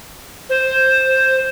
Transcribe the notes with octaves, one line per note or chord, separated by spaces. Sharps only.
C5